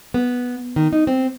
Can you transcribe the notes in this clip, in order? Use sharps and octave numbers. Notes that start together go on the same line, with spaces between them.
B3
D#3
D#4
C4